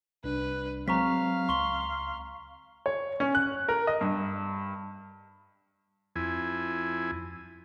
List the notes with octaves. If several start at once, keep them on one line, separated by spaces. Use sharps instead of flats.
C2 D4 B4
F#3 G#3 C4 F5 A#5 C#6 B6
C#2 C6 C#6 G7
C#5
C#4
F#6
A#4
D#5
G2
F2 E4 G#5